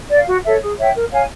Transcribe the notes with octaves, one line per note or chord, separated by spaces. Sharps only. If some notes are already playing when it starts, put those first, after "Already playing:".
D5 F5
F#4
A4 C#5 E5
G#4
C#5 E5 G5
A#4
C#5 F5 G#5